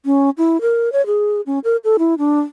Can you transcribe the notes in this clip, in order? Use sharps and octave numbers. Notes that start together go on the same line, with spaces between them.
C#4
E4
A#4
C#5
G#4
C#4
A#4
A4
E4
D4